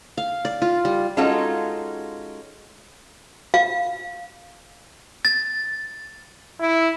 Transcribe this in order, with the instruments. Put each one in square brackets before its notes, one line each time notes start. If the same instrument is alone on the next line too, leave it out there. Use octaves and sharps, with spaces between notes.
[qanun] F5
D5
F4
G3
[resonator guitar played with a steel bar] G#3 C#4 D#4 F4 F#4 A4
[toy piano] F5
[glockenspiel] A6
[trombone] E4